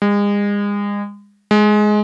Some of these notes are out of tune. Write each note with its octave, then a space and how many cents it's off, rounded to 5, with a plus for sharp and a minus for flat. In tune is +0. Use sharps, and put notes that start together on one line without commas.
G#3 -35
G#3 +15